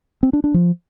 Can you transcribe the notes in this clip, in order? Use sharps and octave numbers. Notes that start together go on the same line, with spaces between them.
C4
D4
D4
F3